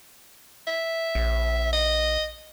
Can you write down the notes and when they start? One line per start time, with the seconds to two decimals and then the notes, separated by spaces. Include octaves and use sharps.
0.67 E5
1.15 A#1
1.73 D#5